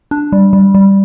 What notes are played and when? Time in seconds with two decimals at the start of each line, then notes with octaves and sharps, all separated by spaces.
0.11 D4
0.32 G3
0.53 G3
0.75 G3